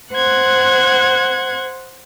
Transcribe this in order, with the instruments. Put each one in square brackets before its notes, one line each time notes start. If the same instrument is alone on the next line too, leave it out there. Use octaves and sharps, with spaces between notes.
[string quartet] C5 F#5 F#6 G#6